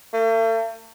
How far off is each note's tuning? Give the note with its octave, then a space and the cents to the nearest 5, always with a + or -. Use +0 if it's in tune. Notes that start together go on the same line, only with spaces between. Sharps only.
A3 +45